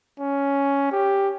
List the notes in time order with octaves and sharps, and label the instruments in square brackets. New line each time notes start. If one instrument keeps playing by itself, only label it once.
[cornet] C#4
G4